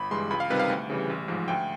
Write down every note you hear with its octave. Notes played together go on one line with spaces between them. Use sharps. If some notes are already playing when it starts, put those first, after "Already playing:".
Already playing: G1 B5
G2 E3 G#3 C6
C#2 B5
F5
C3 D#3 G3 B4
F5
D2
C#3 E3 G3
A1
G#2 F3 G#3
D2 G5